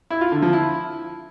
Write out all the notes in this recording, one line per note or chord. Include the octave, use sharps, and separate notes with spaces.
E4
F4
D3
F3
E4